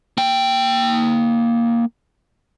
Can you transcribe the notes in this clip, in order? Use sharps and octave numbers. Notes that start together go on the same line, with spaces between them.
A#3 G5